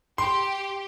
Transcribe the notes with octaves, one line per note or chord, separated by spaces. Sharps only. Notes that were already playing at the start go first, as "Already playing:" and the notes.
G4 C6